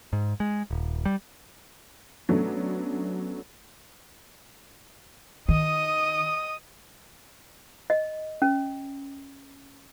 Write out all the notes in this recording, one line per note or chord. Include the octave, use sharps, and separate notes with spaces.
G#2
G#3
D#1
G3
F#3 A3 B3 C#4 D4
D#3 D#5 D#6
D#5
C#4